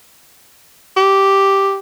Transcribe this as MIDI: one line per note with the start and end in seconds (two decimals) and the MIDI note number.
0.97 1.78 67